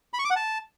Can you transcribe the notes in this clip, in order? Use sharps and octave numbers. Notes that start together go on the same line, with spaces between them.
B5
C#6
D6
F#5
A5